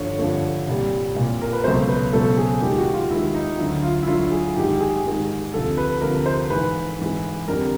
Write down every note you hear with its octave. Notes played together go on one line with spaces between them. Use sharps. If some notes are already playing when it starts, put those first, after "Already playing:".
Already playing: G2 D3 F3 A3 C#5
G2 D3 F3 A3
C2 A#2 G3
C2 A#2 G3
A#4
B4
C#2 B2 F#3 A3 C5
B4
C#2 B2 F#3 A3 A4
G#4
D#2 D#3 G#3 G4
F#4
F4
D#2 D#3 G#3 E4
D#4
D2 D3 F#3 E4
F4
E4
D2 D3 F#3 F4
G#4
G#2 D#3 G#3 G4
G#4
G#2 D#3 G#3
D2 C3 F3 A4
B4
D2 C3 F3 A#4
C5
G#2 E3 G#3 B4
G#2 E3 G#3
F2 D3 G3 A#4